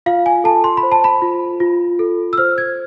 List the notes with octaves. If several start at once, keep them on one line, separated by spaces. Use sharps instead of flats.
F4 F5
G#5
A4 A5
C6
B5
C5
A5
B5
F4
F4
A4
E6
C5 F6
G#6